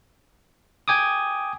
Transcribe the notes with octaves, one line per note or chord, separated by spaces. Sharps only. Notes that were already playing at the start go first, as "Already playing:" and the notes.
G5 G#5 D6 D#6